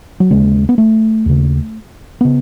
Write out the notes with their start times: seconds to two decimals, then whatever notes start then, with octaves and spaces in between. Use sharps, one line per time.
0.20 F#3
0.30 D#2 C#3 G#3
0.69 B3
0.78 A3
1.26 D#2 C#3
2.21 C#3 B3